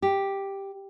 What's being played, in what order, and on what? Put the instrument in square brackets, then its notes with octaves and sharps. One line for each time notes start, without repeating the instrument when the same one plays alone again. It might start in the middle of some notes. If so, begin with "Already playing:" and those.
[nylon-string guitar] G4